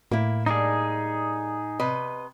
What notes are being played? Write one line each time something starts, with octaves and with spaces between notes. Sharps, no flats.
A2 A#3 E4
G3 A#3 D4 D#4 G#4
C3 B4 D#5